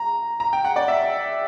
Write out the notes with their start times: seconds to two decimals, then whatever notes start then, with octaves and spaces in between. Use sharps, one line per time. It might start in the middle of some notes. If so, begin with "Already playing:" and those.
Already playing: A#5
0.40 A#5
0.53 G5
0.65 F#5
0.76 D5
0.88 E5